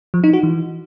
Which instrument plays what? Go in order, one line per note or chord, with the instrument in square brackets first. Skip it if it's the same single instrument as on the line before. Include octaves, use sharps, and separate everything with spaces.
[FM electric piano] F3
D#4
F#4
E3